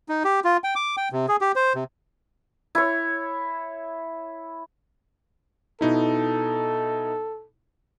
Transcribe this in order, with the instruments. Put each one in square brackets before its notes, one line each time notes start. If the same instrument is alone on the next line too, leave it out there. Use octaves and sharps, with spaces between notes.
[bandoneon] D#4
G4
F4
G5
D6
G5
C3
G#4
G4
C5
C3
[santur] E4 C#5
[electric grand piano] B2 D#4 E4 [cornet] A4